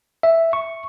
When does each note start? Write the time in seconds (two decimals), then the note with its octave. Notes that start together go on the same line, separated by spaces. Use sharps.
0.23 E5
0.53 C#6